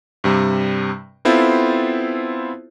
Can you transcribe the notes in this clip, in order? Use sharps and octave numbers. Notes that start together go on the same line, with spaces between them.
G2 C3 G3
B3 C4 E4 F4 A4 C5